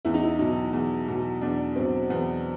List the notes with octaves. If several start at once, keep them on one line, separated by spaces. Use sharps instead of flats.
E2 E4
D#4
E4
B2 F#3 D#4
E2
B2 F#3
E2 D4
B2 F#3 C4
E2 B3